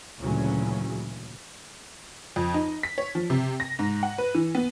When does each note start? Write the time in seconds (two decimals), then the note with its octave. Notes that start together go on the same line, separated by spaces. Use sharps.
0.20 D2 A#2 C#3 E3 F#3 C#4
2.36 F2
2.54 D#4
2.83 B6
2.98 C#5
3.15 F3
3.30 C3
3.60 A#6
3.79 G#2
4.03 F#5
4.18 B4
4.35 E3
4.55 B3